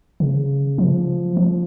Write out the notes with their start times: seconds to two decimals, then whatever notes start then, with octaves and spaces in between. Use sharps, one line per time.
0.20 C#3
0.78 F3
1.37 F3